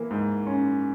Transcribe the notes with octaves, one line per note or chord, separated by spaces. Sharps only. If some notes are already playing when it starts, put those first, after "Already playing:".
Already playing: E3 A#3
G#2
C#4